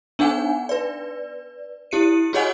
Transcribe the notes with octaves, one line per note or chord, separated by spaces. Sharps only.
B3 D4 D#4 F#5 G#5
B4 D5
E4 G4 C#7 D#7
F#4 G#4 C#5 D#5 F#5 G#5